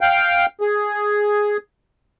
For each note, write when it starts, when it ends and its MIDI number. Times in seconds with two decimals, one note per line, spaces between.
0.01 0.46 77
0.01 0.46 79
0.61 1.57 68